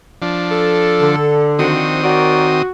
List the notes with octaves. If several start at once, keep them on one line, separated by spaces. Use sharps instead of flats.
F3 D4
A4
D3
D#3 F3 C4 D4 F#4 D#6
F#4 A#4 C#5 D5